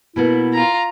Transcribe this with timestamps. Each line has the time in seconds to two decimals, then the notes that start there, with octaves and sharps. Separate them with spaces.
0.16 B2 A#3 B3 E4
0.53 F4 A#5